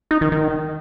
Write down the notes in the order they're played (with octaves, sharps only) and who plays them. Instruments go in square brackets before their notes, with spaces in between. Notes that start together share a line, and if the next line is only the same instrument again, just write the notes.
[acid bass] D#4
D#3
D#3